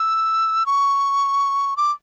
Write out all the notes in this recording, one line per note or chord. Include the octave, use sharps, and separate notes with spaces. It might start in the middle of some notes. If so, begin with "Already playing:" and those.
Already playing: E6
C#6
D6